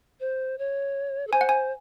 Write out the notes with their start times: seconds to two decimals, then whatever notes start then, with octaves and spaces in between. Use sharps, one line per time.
0.20 C5
0.58 C#5
1.27 A4
1.32 C5 G#5
1.41 F#5
1.49 G#5